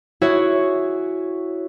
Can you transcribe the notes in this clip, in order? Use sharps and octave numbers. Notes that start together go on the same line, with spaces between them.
E4 F#4 G#4 C#5